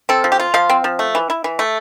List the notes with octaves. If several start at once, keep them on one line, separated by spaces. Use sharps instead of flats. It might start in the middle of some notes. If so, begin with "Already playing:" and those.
C4 A4
F3
G4
F4
F3 F5
C4
F3
A3
E3
E4
E3
A3